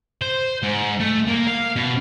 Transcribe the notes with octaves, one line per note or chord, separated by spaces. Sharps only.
C5
G#2
A3
A#3
F5
B2